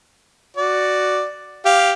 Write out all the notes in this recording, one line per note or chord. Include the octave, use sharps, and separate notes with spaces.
F#4 D5
G4 F5